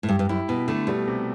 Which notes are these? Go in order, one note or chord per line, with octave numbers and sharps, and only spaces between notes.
A2
G2 G4
G2
F#2 E4
B2 E4
D3 A3
B2 G3
C3